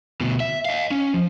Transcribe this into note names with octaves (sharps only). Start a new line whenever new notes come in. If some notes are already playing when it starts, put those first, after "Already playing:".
D2 B2
E5
D#5 F5
C#4
F3